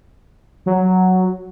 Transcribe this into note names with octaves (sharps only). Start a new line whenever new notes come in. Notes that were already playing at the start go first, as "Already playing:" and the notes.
F#3